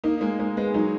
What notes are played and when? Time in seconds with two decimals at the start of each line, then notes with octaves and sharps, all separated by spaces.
0.04 A#3 D#4
0.21 G#3 A#3
0.39 G#3 A#3
0.56 G#3 B3
0.74 F#3 D#4